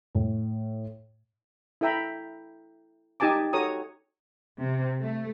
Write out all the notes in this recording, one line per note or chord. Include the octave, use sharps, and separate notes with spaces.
A2
E4 A4 E5 G5 A#5 B5
D#4 G4 G#5 A5 D6
F#4 A4 C#5 A#5 D#6
C3
A3